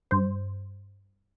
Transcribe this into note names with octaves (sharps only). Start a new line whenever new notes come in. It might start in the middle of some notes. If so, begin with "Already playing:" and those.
G2 C5